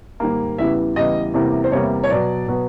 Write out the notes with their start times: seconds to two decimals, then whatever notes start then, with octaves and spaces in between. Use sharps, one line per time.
0.20 G#2 D#3 G3 A#3
0.58 E2 C#3 E3 G3 B3 E5
0.96 E2 C#3 E3 G3 B3 D#5
1.34 E2 C3 E3 G3 A#3
1.64 C5
1.72 E2 C3 E3 G3 A#3 C#5
2.04 C#5
2.10 B2 F#3 B3 D5
2.48 B2 F#3 B3